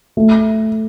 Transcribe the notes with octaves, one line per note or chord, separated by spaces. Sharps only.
A3